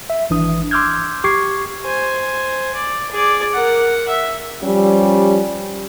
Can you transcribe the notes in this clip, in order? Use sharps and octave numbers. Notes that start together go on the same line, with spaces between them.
E5
G#1 E3 D4 D#6
C6 D6 E6 F6 G6 G#6
G4 C#6 D6 G#6 C7
C5 G#5
D5
G#4 D5
A#4 F#5
E5
F3 G3 C#4 G4